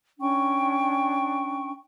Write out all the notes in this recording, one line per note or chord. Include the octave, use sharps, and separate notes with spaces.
C#4 D4 G5 C#6